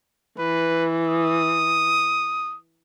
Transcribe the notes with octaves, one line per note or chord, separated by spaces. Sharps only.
E3 B4
D#6